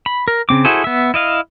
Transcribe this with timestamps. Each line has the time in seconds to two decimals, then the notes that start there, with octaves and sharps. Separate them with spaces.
0.06 B5
0.28 A#4
0.49 C#3 C4 D6
0.65 E4 F#4 G#4 A4 C5
0.84 B3 E5
1.14 E4 D#5 F5